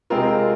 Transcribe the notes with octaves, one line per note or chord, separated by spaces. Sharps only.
C3 G#3 C4 F4 A#4